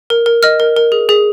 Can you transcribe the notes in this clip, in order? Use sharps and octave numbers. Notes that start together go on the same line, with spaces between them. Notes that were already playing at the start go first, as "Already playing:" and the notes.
A#4
A#4
D#5 F6
A#4
A#4
G#4
G#4